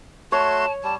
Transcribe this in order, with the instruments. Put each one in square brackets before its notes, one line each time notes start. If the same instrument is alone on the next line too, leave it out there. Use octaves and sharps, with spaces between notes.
[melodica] A3 F#4 C6 [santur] C#5 [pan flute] A5
[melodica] G3 [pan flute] A5